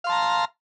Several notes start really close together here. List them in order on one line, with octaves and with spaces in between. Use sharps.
F5 C6 A5 A#5